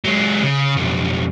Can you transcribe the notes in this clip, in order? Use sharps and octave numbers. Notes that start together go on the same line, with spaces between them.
F#3 G#3
C#3
B1 F2